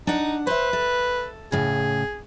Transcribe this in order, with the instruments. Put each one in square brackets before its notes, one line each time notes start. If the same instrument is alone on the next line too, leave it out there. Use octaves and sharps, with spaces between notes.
[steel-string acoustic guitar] D4 F#5 [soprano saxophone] D#4
[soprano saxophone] B4 [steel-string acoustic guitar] C5 E5
[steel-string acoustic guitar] A4
[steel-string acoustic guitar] A2 C#3 [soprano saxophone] G#4